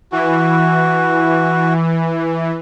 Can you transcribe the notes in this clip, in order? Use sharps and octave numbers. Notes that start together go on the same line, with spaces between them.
E3 F#4